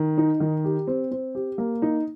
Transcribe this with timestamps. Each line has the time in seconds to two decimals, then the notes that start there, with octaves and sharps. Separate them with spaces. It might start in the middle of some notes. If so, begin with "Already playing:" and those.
Already playing: D#3
0.18 D#4
0.40 D#3
0.64 G4
0.87 C4
1.11 C4
1.35 G4
1.58 A#3
1.82 D#4